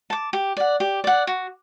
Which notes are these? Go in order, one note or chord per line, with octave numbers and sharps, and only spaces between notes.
A5 D6
G4
D5 F#5
G4
D5 F#5
F#4